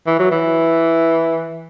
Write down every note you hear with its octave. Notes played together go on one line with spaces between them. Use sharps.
E3
F#3
E3